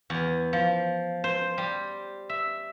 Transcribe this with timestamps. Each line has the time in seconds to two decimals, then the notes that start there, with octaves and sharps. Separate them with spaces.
0.10 E2
0.53 F3
1.24 C5
1.58 G3
2.29 E5